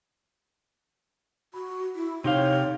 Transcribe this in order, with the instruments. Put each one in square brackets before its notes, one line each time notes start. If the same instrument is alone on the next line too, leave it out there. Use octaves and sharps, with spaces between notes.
[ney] F#4 [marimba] B5
[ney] E4
[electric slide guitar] C3 G4 F5 [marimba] D#4 [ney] C#5